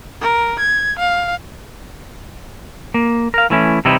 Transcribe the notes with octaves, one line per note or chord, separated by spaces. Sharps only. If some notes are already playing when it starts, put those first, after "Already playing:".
A#4
G#6
F5
A#3
A#4 F5
E3 A3 C#4 E4
C3 E3 G3 D#4 E4